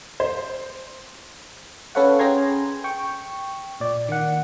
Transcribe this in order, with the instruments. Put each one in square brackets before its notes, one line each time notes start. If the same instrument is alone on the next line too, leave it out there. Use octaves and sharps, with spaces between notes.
[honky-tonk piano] C5
[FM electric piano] C#4 A4 B4 C#5 F5 F#5
C#4 G#4 G5 A#5 C6 G#6
G5 C#6
A#2 D5
D#3 F#5